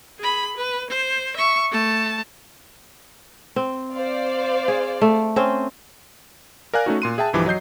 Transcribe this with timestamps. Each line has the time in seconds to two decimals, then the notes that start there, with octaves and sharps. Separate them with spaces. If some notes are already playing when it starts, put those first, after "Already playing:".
0.19 G#4 B5
0.57 B4
0.90 C5
1.36 E5 C#6
1.71 A3 A5
3.56 C4
3.93 C5 D5 F5
4.68 G#4
5.01 A3
5.36 C4 C#4 C5
6.74 A#4 D5 F5 G#5 F#6
6.86 A3 C#4 D#4 F#4
7.02 A#2 C6 D#7
7.18 G#4 E5 G5 A5
7.33 B1 G2 E3 F3 G4 D6
7.46 F#3 D#5 G6 C7